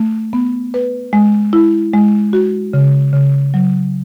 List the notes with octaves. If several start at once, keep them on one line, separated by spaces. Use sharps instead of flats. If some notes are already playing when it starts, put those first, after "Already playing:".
Already playing: A3
B3
B4
G#3
E4
G#3
F#4
C#3
C#3
F#3